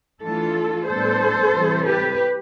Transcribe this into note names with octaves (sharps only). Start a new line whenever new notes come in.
E3 A3 D4 F4 A4
A2 G3 B3 D4 A4 C5
C3 E3 G3
G4 B4